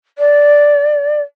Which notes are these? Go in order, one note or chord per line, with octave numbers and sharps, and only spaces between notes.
D5